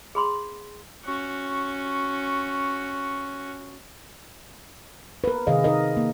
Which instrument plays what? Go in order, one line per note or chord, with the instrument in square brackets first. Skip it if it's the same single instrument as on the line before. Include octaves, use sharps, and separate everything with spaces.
[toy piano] G#4 B5 C6
[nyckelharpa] C#4 F#4
[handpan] A#4 B4
C3 D#3 G#4 D#5 F5
D#4 A#4 D#5
A#3